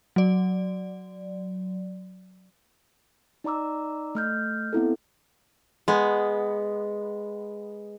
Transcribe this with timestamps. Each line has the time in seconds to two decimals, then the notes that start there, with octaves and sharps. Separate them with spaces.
0.16 F#3 D5
3.44 D#4 D5 A#5 D6 E6
4.15 A3 F6 G6
4.73 B3 C4 E4 A4
5.88 G#3 B3